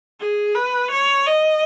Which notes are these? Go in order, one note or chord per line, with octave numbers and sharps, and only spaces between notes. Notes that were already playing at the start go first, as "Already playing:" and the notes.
G#4
B4
C#5
D#5